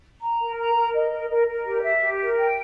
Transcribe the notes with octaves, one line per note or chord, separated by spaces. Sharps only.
A#5
A#4
A#5
A#4
D#5
A#4
A#4
A#4
G4
E5
G4
A#4
G5